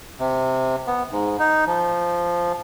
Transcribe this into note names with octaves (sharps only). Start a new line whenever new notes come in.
C3
B3
G#2
D#4
F3